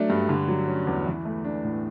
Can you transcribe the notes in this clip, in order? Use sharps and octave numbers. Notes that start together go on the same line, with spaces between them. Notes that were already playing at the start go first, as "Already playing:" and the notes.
Already playing: F#3 A3 D4
G2
D3
F#3
C#4
E2
E3
A3
D4
A2